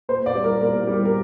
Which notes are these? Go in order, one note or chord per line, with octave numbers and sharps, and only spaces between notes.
A#2 C5
D5
G3
A#4
A#2 A#4
G3
A#4